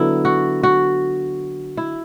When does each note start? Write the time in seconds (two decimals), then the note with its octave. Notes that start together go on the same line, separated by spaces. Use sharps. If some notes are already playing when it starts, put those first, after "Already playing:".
Already playing: D3 F#3 B3 E4
0.25 F#4
0.63 F#4
1.77 E4